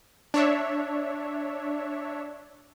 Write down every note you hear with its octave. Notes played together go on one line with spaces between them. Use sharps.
D4 C#5 E5